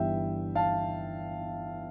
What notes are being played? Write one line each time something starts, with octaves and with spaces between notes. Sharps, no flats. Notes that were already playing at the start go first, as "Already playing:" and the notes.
Already playing: G1 G2 E3 G3 E5 G5
F5 A5